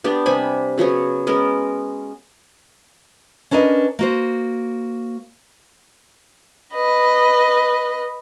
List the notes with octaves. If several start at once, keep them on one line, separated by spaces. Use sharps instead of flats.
B3 D4 G4 D5
C3 G3 G#5 B5
C#3 F#3 B3 C#5
G#3 B3 C#4 A#4
C#4 D4 A#4 B4 D#5
A#3 F#4 C5
B4 D#5